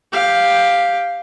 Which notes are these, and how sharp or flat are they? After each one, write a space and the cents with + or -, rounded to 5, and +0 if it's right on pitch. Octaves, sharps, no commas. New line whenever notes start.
G4 +5 F5 +0